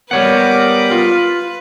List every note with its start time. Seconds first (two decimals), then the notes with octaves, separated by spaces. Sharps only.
0.11 G3 B3 A#4 B4 C#5 F#5 D6
0.91 F4